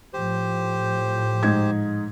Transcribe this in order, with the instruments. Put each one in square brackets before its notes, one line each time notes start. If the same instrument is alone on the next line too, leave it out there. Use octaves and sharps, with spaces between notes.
[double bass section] A2 F3 [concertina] G4 C5
[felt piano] G#2 D#4 G#6